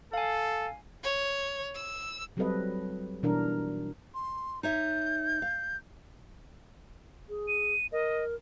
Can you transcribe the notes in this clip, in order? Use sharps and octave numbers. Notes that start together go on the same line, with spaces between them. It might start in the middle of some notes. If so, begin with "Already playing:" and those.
A4 F5 G#5
C#5
E6
F#3 G3 C4 A4 B4 D#5
B2 E3 G3 D4 D#4 A#4
C6
D#4 C#5 E5 G6
F5
G#4
D#7
A#4 D#5